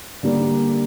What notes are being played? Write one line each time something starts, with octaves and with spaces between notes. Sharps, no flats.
D3 G3 A#3 D4